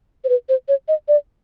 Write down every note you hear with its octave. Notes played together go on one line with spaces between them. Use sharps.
C5
B4
C5
C#5
D#5
D5